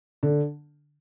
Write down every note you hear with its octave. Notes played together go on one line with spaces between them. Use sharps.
D3